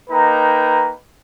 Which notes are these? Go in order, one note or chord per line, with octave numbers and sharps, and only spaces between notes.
A#3 D#4 B4 G5 A#5